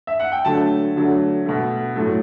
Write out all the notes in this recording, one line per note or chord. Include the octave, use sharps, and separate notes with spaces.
E5
F#5
G5
D3 F#3 A3 A5
D3 F#3 A3
B2 A3
A2 F#3 A3